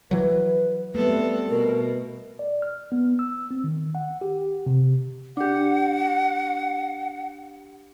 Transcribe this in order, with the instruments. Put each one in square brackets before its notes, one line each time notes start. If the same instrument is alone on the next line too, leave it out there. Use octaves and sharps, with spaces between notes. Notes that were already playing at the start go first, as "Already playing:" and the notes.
[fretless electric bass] E3 F#3 [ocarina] B4
[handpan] G3 A3 [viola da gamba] B3 C4 A4 [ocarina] B4
[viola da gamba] B2 [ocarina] A#4
[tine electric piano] D5
F6
B3
E6
C4
D#3
F#5
G4
C3
[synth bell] D4 G4 [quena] F#5